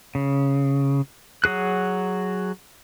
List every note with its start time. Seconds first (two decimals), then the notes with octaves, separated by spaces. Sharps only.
0.15 C#3
1.44 F#3 F#4 G#4 F#6